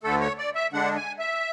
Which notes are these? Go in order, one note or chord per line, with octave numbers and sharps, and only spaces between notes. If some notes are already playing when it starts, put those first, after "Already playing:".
D2 D3 A3 A4
C#5
D5
E5
D3 G#3 D4 F#5
G#5
E5